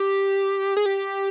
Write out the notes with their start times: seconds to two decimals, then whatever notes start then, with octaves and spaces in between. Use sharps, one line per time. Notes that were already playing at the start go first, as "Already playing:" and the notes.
Already playing: G4
0.77 G#4
0.86 G4